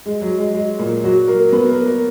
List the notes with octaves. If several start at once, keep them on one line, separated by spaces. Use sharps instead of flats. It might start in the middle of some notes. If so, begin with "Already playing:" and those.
G#3
F#3
G#3
G#3
A#2 A#3
F#3 F#4
A#3 A#4
B3 B4
A#3 A#4
A#3 A#4